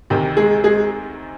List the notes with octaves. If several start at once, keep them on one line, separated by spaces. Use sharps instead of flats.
D2 C3 D#3 G4
G#3 G#4
G#3 G#4